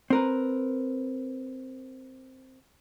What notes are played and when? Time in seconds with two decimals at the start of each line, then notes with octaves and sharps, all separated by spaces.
0.10 C4 A#4 B4